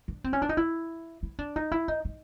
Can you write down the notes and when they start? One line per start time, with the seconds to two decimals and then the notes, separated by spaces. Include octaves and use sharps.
0.08 D4
0.24 C4
0.33 C#4
0.42 D4
0.49 D#4
0.57 E4
1.23 E4
1.39 D4
1.56 D#4
1.72 E4
1.88 D#4
2.05 D#4